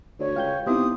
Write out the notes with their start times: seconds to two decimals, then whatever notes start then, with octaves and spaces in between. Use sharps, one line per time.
0.20 D2 C#5
0.36 C#2 F5 G5 G6
0.67 C3 B3 D#4 E4 D#6